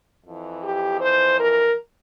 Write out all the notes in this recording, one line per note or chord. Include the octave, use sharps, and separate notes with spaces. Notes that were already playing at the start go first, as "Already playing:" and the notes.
F2 E3
G4
C5
A#4